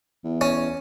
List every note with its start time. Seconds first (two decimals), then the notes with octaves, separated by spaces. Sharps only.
0.24 E2
0.41 C#4